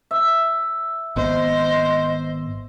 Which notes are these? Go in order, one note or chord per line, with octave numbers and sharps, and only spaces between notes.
E5
G#1 B3 C5 D#5